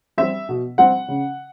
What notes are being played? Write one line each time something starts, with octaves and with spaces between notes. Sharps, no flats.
G3 C4 E5
B2
G3 C4 F#5
C#3